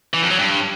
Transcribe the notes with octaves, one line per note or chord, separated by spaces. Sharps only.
E3
F2
F#3
G2